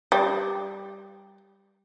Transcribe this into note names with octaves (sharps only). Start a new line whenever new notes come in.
G3